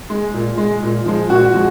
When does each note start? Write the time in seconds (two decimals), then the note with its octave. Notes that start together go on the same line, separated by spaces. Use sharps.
0.10 G#3
0.34 A#2
0.58 G#3
0.82 A#2
1.06 F3 G#3
1.30 A#2 F#4
1.54 F3 G#3